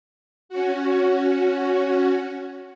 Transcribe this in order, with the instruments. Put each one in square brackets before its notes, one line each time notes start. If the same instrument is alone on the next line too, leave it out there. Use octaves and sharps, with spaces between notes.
[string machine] C#4 F#4